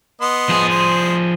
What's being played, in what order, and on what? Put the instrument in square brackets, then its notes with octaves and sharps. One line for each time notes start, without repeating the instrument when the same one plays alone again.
[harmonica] B3 D#5 C6
[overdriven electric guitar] F3 G#4
[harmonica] C5